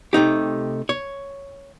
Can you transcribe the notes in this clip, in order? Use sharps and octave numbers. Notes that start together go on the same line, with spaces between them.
C3 A3 D#4 G4
C#5